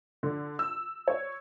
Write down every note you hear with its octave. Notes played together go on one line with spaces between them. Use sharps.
D3
E6
C#5